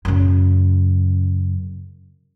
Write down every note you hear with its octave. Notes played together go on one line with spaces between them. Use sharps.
F#2 C#3